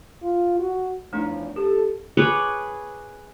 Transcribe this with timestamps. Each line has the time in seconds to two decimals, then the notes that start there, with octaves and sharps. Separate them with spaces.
0.22 F4
0.59 F#4
1.13 E2 F3 A3 D4 D#4 C#5
1.56 G4 A4
2.17 G#4 B4 C#5 D6